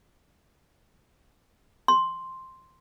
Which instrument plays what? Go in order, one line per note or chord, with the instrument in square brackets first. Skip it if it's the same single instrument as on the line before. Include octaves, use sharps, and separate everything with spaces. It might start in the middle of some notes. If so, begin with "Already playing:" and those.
[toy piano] C6